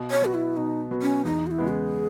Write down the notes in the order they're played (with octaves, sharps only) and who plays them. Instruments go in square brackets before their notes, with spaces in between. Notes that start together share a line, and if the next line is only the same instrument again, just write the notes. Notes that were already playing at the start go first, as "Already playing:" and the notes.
Already playing: [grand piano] B2
[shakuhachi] C#5
[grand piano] F#3 B3 [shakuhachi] F#4
[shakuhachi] E4
[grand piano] B2 [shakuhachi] D#4
[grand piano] F#3 B3
[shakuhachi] C#4
[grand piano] E2 [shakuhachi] D#4
[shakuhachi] F#4
E4
[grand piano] C#3 G#3 B3
[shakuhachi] G#4